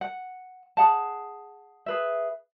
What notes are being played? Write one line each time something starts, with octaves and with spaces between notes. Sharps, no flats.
F#5
G#4 F#5 A5
G#4 B4 E5